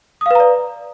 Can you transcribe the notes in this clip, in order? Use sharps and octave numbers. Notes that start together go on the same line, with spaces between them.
B4 D5 F5 A#5 D#6